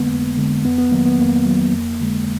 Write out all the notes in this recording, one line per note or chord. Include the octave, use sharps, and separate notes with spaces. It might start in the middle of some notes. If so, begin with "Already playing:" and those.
Already playing: F2 D3 G#3 A#3 B3
F2
D3 G#3
F2 B3
B3
D#3 F#3 A#3
B3
F2 A#3
D#3 F#3
F2
D3 G#3